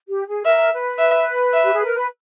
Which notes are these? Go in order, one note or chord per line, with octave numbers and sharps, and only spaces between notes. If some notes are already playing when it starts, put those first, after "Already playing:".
G4
G#4
A#4 E5
B4
E5
E5
G4
G#4
A#4
B4